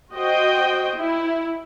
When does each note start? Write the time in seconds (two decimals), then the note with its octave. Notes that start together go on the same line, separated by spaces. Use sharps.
0.12 F#4 C5 D#5 G5
0.97 E4